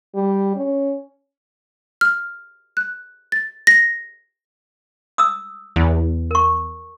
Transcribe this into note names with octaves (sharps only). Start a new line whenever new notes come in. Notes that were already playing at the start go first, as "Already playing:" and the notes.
G3
C#4
F6
F#6
A6
A#6
D#6 E6
E2
A#4 C#6